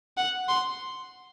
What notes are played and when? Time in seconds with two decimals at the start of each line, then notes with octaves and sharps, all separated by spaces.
0.17 F#5
0.49 C6